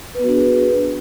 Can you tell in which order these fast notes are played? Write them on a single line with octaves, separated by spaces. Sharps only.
B4 B3 F#4 D4 G#4